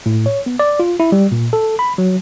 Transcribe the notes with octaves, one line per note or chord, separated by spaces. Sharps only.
A2
C#5
B3
D5
F4
E4
G3
A#2
A4
B5
F#3